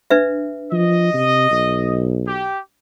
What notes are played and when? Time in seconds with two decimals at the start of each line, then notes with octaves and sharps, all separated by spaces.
0.10 D4 B4 E5
0.72 F3 D#5
1.14 C3
1.51 B1
2.27 G4